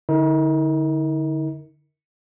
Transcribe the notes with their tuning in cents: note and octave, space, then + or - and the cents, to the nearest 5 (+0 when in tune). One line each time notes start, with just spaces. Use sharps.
D3 +0 D#4 +45 A#4 +0